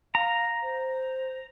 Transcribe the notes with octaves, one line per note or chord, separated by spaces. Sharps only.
F5 A#5
C5